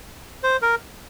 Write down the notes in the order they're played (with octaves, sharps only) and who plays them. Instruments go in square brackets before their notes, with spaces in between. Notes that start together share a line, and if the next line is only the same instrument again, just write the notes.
[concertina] C5
A#4